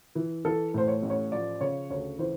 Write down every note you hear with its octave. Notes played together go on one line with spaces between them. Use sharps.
E3
E3 A4
A2 C5
C#5
A1
C#5
F3 D5
C#3 C#5
D2 C#5
E3 C5